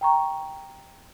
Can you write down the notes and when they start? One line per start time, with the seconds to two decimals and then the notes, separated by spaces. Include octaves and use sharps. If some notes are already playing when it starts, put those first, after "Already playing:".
0.01 G5 A#5 C#6